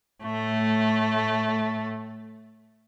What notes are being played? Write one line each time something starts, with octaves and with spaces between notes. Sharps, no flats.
A2 A3